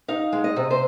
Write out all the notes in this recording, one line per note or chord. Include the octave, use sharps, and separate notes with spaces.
D#4 F5
G#3
D#5
C3
C5